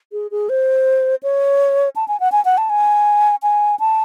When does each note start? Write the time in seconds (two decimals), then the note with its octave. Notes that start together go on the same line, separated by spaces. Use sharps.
0.12 G#4
0.31 G#4
0.49 C5
1.23 C#5
1.96 A5
2.08 G#5
2.20 F#5
2.32 G#5
2.45 F#5
2.58 A5
2.70 G#5
3.43 G#5
3.80 A5